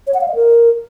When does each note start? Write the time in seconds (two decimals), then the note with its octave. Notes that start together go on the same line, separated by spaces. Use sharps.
0.07 C#5
0.14 F#5
0.21 F5
0.28 D#5
0.35 A#4